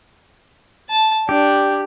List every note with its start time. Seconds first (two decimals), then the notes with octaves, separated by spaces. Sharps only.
0.90 A5
1.29 D4 G4